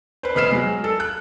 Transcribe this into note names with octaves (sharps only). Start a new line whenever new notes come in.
B4 C5
F1 B4 D#5 F6 C7 E7
F#3 G#3
A4
F#6